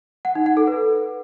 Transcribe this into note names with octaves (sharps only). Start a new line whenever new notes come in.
F#5
D#4
F#5
A4
B4